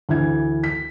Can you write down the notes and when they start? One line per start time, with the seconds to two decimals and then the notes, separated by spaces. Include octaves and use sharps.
0.09 D2 E3 G#6
0.64 B6